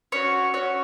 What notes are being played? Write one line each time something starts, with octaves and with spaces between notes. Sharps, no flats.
C#4 F#4 C#5
C#4 F#4 C#5